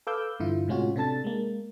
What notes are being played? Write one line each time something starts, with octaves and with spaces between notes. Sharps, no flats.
A4 B4 F5 D6 E6 G6
G2 D3 E3 E4 F4
A2 C3 G#3 C#4 F4 F#4
C3 D4 A4 A5 A6
G#3 A#3